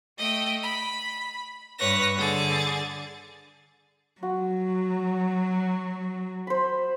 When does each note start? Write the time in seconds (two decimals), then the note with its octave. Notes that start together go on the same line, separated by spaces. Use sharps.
0.17 A3 D#5 G5
0.63 B5
1.78 G2 B4 C#5 A#6
2.17 D3 G#4 A6
4.23 F#3 F#4
6.47 C5 B5